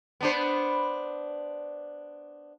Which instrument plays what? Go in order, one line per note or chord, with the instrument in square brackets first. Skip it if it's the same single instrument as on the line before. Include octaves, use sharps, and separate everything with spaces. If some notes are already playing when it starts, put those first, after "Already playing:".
[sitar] B3 D4 C5